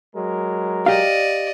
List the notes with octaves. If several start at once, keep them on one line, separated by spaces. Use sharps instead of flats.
F#3 G#3 A#4
G4 D5 D#5 F5